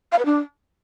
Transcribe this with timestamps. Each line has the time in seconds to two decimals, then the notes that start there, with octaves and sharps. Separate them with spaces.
0.12 F5
0.19 B4
0.25 D4